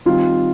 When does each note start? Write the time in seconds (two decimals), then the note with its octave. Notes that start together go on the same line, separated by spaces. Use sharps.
0.05 D#3 G3 C4 D#4 F4